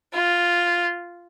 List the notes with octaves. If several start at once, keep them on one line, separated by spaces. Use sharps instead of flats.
F4